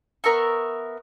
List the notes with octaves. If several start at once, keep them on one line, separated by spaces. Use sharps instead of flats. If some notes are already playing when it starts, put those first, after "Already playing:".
B3 A#4 E5 C#6